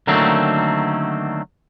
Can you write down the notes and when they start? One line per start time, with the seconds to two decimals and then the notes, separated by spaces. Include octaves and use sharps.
0.07 D3 D#3 F#3 A3 A#3 C4